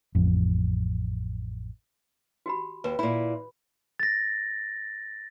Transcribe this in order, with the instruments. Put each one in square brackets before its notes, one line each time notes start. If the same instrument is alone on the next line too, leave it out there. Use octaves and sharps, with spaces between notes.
[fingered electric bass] A1 F2
[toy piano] F#4 G4 B5
[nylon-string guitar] D#2 [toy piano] B4
[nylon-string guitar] A#2 E4 [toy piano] B5
[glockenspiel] A6 A#6